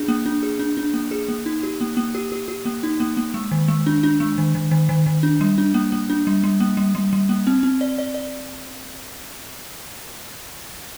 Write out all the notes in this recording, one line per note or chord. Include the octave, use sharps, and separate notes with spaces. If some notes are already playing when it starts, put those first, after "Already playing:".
Already playing: D4 G#4
A#3
D4
G#4
D4
D4
A#3
G#4
A#3
D#4
G4
A#3
A#3
G4
G4
G4
A#3
D#4
A#3
A#3
G#3
D#3
G#3
D4
D4
G#3
D#3
D#3
D#3
D#3
D#3
D4
G3
D4
A#3
A#3
D4
G3
G3
A#3
G3
G3
G3
A#3
C4
C4
D5
D5
D5